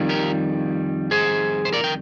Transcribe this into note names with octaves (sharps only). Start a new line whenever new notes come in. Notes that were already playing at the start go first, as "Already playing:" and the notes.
Already playing: F2 D#3 G3
G4 A#4
G#4 C5
C5
A#4 D5
G5